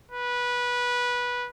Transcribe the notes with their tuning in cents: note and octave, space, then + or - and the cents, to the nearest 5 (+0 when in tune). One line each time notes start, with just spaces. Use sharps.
B4 -15